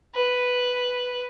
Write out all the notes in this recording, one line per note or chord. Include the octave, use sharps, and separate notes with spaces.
B4